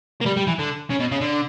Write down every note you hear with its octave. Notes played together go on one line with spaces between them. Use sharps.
A#3
G3
G3
E3
D3
C#3
B2
C#3
D3